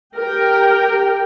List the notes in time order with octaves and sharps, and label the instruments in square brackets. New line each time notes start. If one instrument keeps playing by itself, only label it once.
[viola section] G4 A#4 G5